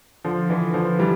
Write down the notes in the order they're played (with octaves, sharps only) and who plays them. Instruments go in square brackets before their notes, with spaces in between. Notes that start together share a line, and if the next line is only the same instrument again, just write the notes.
[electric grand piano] D3 [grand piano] F3
[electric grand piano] D3 [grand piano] E3
[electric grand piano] D3 [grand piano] F3
[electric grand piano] E3 [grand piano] G3